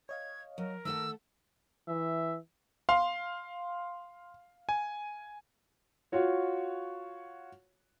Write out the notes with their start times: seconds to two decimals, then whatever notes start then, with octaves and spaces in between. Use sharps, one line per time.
0.09 C#5 D#5 F5 G#6
0.58 F#3 A#4
0.85 D#3 A3 A4 F#5 E6
1.88 E3 E5
2.89 F5 C6
4.69 G#5
6.12 F4 F#4 C#5